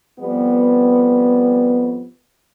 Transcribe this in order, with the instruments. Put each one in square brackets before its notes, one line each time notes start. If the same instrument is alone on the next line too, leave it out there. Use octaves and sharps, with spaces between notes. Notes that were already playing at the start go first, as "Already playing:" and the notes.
[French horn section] F2 G3 B3